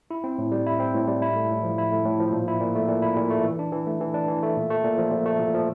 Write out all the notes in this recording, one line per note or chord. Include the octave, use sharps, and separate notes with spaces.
E4
C4
A2
G3
E4
C4
A2
G3
E4
A3
A2
F3
E4
A3
A2
F3
A#2
E4
A#2
A3
A#2
E4
A#2
A3
E3
D4
E3
A3
E3
D4
E3
A3
A#2
A3
A#2
F3
A#2
A3
A#2
F3